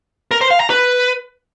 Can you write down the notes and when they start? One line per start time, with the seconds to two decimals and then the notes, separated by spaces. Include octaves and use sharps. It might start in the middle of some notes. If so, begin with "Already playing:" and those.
0.31 A#4
0.41 C5
0.51 F5
0.60 A#5
0.70 B4